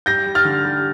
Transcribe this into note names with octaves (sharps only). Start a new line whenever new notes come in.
G3 G6 A#6
G3
F6 A6
D3
G3